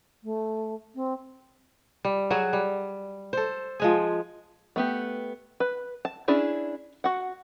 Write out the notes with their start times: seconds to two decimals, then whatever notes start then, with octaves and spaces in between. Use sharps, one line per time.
0.24 A3
0.95 C4
2.05 G3
2.31 F#3 F#4 G#4
2.53 G3
3.33 A4 C5
3.80 F3 G#3 G#4
4.76 A3 B3 G4
5.60 B4
6.05 A5
6.28 C#4 D4 E4 G#4
7.04 F#4 F#5